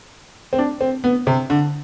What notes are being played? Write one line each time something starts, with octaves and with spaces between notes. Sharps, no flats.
C4
D4
C4
B3
C3
D3